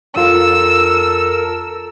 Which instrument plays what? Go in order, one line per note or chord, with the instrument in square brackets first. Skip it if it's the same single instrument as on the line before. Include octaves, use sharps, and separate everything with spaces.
[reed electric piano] F2 F4 [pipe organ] A4 A#4 [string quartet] E6